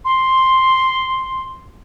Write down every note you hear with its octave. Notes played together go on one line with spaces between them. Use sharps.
C6